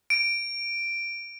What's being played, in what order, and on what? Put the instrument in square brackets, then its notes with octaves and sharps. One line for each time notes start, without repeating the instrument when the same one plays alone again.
[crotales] D7